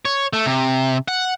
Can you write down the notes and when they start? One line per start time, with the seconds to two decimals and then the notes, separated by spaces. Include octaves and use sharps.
0.05 C#5
0.33 A3
0.46 C3
1.08 F#5